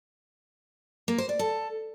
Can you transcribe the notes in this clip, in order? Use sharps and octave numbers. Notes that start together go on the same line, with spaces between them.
A#3
C5
D5
A4